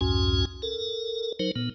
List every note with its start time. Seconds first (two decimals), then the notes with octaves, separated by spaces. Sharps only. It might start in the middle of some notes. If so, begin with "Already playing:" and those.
0.01 C2 F2 G#2 C#4 F#4 G#5
0.62 A4 A#4
1.39 F#3 D#4 A#4 C5
1.56 A#2 B3